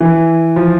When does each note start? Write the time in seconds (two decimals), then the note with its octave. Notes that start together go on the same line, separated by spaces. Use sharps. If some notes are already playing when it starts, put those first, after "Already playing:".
0.01 E3
0.56 F3